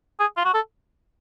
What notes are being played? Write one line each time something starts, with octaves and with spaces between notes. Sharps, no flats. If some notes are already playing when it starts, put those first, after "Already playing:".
G#4
F4
F#4
A4